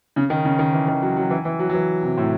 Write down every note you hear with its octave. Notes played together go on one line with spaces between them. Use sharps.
C#3
D#3
C#3
D#3
E3
D#3
F#3
F#3
E3
E3
F#3
F#3
E3
C3
A2